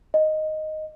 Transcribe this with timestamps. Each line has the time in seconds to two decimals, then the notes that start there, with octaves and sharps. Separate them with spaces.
0.14 D#5